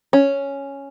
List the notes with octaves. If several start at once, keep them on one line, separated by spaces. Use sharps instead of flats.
C#4